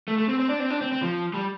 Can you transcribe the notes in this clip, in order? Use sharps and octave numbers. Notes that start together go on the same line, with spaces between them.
A3
A3
C4
C4
D4
C4
D4
C4
C4
F3
G3